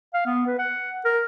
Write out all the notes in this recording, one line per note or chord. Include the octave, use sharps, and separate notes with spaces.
F5
B3
B4
F#5
A#4